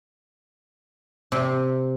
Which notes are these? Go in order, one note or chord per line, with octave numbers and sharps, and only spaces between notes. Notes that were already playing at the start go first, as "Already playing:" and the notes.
C3